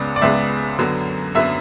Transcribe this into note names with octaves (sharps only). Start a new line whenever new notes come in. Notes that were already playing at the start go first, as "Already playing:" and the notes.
Already playing: C#2 C#3 G#3 B3 D5
D5
C#2 C#3 G#3 B3 E5
F#2 D3 F#3 B3
F#2 D3 F#3 B3 E5